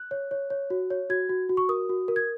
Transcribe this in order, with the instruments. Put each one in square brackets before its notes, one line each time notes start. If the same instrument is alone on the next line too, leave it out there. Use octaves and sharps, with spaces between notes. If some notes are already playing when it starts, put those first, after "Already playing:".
Already playing: [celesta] F#6
C#5
C#5
C#5
F#4
C#5
F#4 G#6
F#4
F#4
C#6
A#4 D#6
F#4
A#4
G#6